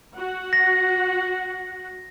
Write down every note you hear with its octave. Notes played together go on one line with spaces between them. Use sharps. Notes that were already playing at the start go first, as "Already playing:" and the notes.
F#4 F#5
A#6